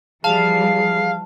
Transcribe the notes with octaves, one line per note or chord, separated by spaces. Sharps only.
E3 F3 G3 G#4 F5 A5